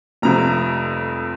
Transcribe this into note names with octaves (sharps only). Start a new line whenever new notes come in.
F1 F2 C3 A#5